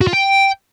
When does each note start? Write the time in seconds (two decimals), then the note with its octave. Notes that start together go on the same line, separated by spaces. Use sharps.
0.01 F#4
0.07 F4
0.13 G5